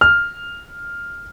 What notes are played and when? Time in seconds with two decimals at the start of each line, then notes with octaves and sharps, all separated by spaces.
0.01 F6